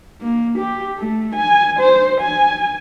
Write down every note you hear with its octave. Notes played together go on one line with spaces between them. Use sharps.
A#3
G4
A3
G#5
C5
G#5